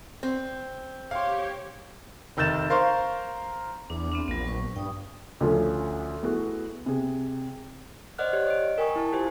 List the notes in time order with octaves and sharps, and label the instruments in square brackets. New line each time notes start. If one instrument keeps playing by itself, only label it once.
[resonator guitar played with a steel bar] C4
[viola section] G4 C#5 [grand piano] F5 C6
[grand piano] F1 D#3 E6 G6 A6 E7
A#4 C5 F5 C6 C#6 F6
[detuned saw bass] E2 [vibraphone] D4 D6
[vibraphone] B3 C4 D4
[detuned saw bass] A#1 [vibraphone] F#3 B3
[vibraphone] B4 C#6
[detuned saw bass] G2 [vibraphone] G5 D#6
[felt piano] D2 F3 A3 C#4
A3 B3 E4 F#4 G#4
C3 G#4
[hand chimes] C5 D5 D#5 F#5 F6 F#6
G4 C#5
D#5 D7
A#4 G5 G#5 C#6 D#6
E4 A5
F4 G4 C5 G#5